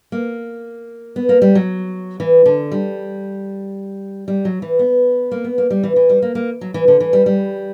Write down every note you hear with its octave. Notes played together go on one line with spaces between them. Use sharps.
A#3
B3
A#3
G3
F#3
E3
D3
G3
G3
F#3
E3
B3
A#3
B3
A#3
G3
E3
E3
G3
A#3
A#3
F#3
E3
D3
E3
G3
G3